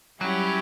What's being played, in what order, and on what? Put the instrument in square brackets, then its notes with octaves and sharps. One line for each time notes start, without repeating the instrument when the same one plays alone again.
[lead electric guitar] F#3 [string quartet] G3 C#4 E4 G4